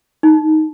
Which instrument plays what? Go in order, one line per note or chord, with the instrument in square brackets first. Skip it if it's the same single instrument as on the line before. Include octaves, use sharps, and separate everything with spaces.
[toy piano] D#4